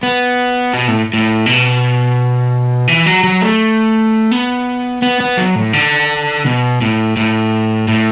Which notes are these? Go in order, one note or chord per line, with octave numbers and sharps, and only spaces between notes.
B3
B2
A2
A2
B2
E3
F#3
F#3
A3
B3
B3
B3
F#3
A2
D3
B2
A2
A2
A2